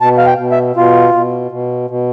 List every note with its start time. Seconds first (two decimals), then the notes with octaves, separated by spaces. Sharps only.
0.01 B2 A5
0.18 F5
0.26 G5
0.39 B2
0.51 E5
0.76 B2 F4
1.14 B2
1.52 B2
1.90 B2